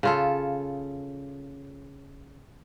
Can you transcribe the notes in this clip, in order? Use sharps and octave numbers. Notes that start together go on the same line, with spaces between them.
C#3 F4 A4